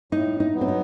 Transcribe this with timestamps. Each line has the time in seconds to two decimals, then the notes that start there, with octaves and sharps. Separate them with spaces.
0.12 A2 D#4
0.40 D#4
0.54 F#3 B3
0.61 C4
0.68 D#4